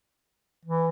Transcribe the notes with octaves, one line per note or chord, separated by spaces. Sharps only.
E3